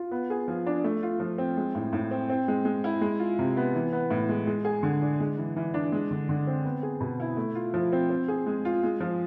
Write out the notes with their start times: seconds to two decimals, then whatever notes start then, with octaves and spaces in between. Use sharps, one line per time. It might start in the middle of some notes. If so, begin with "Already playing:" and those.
Already playing: F4
0.11 B3
0.30 G#4
0.48 F3
0.66 D4
0.84 A3
1.03 F4
1.20 F3
1.38 C4
1.57 G#3
1.75 A2
1.93 A2
2.11 C4
2.29 C4
2.48 G#3
2.65 G#3
2.84 E4
3.01 G#3
3.19 F4
3.39 C3
3.57 B3
3.75 E3
3.93 B3
4.10 A2
4.29 G#3
4.47 G#3
4.65 G#4
4.83 D3
5.02 D4
5.20 G#3
5.38 E3
5.56 E3
5.74 D4
5.92 G#3
6.11 D3
6.29 D3
6.47 C4
6.65 B3
6.83 G#4
7.01 B2
7.20 E4
7.37 A3
7.55 F4
7.74 F3
7.92 C4
8.10 C4
8.28 G#4
8.46 G#3
8.65 F4
8.83 G#3
9.00 F3